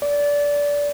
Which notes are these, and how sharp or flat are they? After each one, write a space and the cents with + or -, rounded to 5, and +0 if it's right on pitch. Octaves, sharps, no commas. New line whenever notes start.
D5 -20